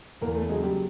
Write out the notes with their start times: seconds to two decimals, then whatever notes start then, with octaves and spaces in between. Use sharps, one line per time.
0.21 E2 A#3 A#4
0.35 A3 A4
0.49 C#3 F#3 G#3 G#4
0.63 G3 G4